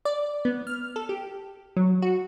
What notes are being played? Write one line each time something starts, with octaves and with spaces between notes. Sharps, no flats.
D5
B3
F6
A4
G4
F#3
F#4